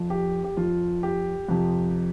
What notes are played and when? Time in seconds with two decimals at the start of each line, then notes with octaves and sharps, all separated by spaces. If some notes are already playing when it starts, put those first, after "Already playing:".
Already playing: F2 F3
0.10 G4
0.44 G4
0.57 F2 F3 F4
1.03 G4
1.48 F2 C3 F3